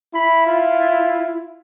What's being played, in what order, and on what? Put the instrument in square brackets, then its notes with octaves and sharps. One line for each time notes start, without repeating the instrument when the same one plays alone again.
[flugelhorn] E4 [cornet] B5
[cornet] F4